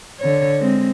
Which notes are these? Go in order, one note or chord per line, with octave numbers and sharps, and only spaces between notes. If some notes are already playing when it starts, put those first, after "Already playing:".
D3 C#5
G#3 C4